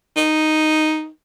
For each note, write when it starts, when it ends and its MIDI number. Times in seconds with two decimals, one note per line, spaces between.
0.16 1.08 63